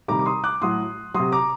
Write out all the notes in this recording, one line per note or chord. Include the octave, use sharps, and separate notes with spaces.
C3 D#3 G3 A#5 D6
D6
C6 D#6
D6 F#6
A2 F#3 C6 D#6
C3 F#3 C6 D#6
A#5 D6